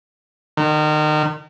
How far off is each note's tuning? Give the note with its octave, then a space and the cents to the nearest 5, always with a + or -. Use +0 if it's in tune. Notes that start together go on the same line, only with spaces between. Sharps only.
D#3 -30